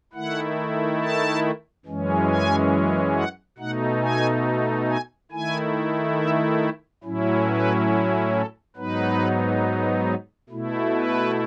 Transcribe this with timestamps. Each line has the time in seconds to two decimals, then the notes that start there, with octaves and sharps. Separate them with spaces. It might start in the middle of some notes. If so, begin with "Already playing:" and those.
0.13 D#3 A3 E4 F#5
1.01 A5
1.86 F#2 E3 G#3 C#4
2.30 G#5
3.16 F#5
3.58 B2 A3 D#4 F#5
4.01 G#5
4.88 G#5
5.32 D#3 A3 E4 G#5
6.17 E5
7.04 A2 F#3 C#4 E4
7.46 B4
8.33 A4
8.76 G#2 F#3 B3 D#4 B4
10.49 B2 A3 E4
10.92 B4